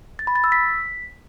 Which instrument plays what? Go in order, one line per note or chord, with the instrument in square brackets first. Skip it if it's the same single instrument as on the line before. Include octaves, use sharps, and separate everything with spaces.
[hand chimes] A6
B5
A6
E6
B6